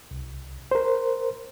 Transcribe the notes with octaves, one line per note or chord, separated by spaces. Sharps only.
C2
A#4 C5